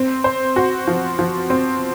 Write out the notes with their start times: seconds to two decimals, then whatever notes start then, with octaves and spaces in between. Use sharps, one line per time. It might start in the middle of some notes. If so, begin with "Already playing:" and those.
Already playing: C4
0.24 C5
0.56 F#4
0.87 F3
1.19 F3
1.50 C4